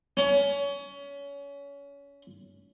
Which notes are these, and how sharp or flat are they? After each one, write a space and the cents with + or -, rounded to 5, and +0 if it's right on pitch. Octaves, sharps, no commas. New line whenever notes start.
C#4 +25